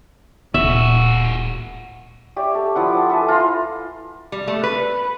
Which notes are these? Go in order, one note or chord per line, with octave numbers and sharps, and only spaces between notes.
D1 A#2 G#3 F#4 E5
G4 C#5 D5 E5
A4
F3 E4 F#5
D6
A4 B4 E5 G#5
F4 A#5 C6
G3
A3
B4